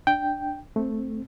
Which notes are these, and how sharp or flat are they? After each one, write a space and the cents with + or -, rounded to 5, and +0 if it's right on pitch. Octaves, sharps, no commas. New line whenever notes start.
D4 +10 G5 +0
A3 +0 C4 +0